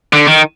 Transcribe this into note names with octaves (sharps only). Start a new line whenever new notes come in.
D3
D#3